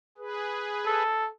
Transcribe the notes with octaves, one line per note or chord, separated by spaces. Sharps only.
G#4 B4
A4